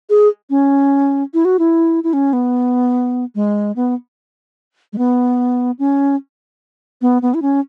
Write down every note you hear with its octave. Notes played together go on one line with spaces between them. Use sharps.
G#4
C#4
E4
F#4
E4
E4
C#4
B3
G#3
B3
G#3
B3
C#4
B3
B3
E4
C#4